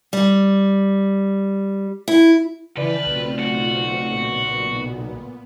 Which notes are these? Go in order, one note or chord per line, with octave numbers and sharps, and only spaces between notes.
G3
E4
C#3 E3 B4 D5 G5 A5 F6
B1 A3 C4 F4
F#4
A#2 B3